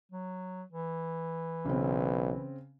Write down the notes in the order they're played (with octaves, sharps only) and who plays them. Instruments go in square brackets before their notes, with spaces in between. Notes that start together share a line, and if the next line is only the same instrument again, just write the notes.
[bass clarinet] F#3
E3
[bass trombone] B1 [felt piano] C#3 C4